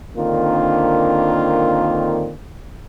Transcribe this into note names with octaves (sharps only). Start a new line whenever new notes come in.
D3 D#3 A#3 C4 D4 F4